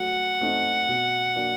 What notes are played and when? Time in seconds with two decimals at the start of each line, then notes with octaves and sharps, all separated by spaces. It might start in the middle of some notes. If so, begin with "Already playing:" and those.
Already playing: F#3 A3 F#5
0.41 A3 C4 D#4
0.88 B2
1.36 F#3 A#3 D4